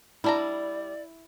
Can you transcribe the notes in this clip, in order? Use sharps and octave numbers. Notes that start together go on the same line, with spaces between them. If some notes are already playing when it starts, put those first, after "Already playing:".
G3 D4 E4 D5 A#5